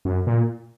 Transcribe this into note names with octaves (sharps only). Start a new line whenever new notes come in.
F#2
A#2